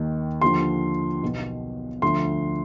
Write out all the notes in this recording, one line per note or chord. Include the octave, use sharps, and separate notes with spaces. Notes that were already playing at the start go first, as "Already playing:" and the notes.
Already playing: D#2 D#3
D#2 D3 F3 C6
B1 B2
D2 D3 F3 C6